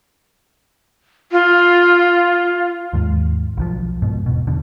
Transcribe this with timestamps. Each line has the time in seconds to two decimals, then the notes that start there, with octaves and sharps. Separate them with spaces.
1.32 F4
2.93 D#2 G#2
3.57 B1 D#3 F3
4.02 G#2 B2
4.26 E1 B2
4.47 E1 B2 D3